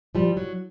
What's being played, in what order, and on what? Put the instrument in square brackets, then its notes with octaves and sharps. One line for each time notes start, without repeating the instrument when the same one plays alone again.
[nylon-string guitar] F3 G3
F#3